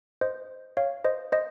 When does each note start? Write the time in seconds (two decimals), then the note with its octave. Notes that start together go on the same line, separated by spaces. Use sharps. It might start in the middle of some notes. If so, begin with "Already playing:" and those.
0.21 C5 D#5
0.77 C#5 F5
1.04 C5 D#5
1.32 C5 D#5